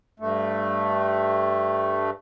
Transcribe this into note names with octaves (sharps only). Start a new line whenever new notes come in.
G2 A3